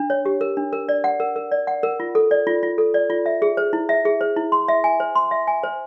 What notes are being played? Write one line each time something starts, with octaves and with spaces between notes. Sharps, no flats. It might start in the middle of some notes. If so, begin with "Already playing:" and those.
Already playing: D4
C#5
G4
A#4
D4
A#4
D5
F#5
A#4
A#4
D5
F#5
A#4
F4
A4
D5
F4
F4
A4
D5
F4
E5
G#4
C5
E4
E5
G#4
C5
E4
C6
E5
G#5
C5
C6
E5
G#5
C5